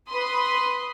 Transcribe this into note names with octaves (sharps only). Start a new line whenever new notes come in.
B4 B5 C6 D#6